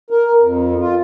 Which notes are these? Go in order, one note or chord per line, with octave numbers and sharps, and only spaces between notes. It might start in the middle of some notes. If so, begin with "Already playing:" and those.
A#4
F2
F4